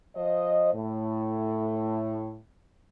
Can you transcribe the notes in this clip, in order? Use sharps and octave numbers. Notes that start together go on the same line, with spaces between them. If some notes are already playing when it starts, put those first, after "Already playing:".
F3 C5 D#5
A2